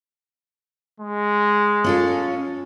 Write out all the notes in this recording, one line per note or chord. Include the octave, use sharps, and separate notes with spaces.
G#3
C#4 F4 A4